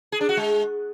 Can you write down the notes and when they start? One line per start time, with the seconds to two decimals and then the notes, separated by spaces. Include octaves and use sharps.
0.12 G#4
0.21 D4
0.29 F#4
0.37 G#3